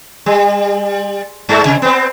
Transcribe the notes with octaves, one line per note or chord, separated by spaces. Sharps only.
G3
G2 G#3 A3
C3
B3 C4